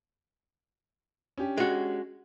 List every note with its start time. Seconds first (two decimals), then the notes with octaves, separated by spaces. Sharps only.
1.38 C#4 D4 G4
1.57 G#3 F#4